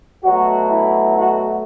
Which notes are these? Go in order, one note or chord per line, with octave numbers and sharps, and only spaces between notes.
B2 F#3 A3 F#4
E4
F#4